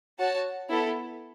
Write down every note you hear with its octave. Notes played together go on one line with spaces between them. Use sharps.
F#4 C#5 F#5 A5
B3 E4 A4